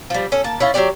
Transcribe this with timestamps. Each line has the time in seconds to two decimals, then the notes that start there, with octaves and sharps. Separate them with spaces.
0.10 F3 G3
0.32 C#4 A4
0.44 A#3 A5
0.60 C#4 E4 F4
0.74 F#3 C#4 G4 D5